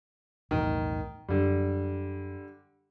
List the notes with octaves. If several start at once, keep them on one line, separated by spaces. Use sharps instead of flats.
B1 E2 A2 D#3
F#2 D3 G3